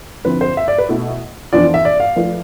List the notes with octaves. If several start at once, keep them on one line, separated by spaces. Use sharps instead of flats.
D3 F3 C4 E4 B4
C5
E5
D5
B4
B2 A3 E4
F2 E3 B3 D4 F4 D5
E5
D5
F5
F3 A3 E4 B4 D5